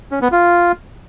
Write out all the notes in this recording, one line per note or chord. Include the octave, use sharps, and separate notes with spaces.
C#4
B3
F4